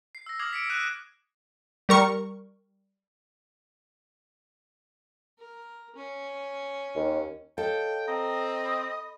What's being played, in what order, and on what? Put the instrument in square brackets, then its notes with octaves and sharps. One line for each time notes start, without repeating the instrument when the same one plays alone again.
[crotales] C7
E6 A#6
D6 D#6 F6 G#6 C7 F#7
B6 C#7 D7
D6 E6 F#6 D#7 E7
[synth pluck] G3 A#4 C#6
[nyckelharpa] A#4
C#4
[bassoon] D#2
[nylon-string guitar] A4 [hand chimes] C#5 D#5 F5 [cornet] G5
[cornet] C4 [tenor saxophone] D#5 [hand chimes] G5 A#5
[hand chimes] B5 D#6